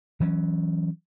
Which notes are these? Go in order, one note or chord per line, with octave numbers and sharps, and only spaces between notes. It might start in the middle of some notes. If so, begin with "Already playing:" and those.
E3 F#3 C#4